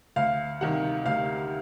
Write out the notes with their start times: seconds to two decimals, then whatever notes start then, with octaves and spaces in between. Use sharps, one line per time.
0.16 D2 F5
0.61 C3 D#3 G3 F#5
1.05 D2 F5